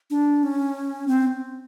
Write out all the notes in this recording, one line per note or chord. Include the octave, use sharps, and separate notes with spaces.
D4
C#4
C4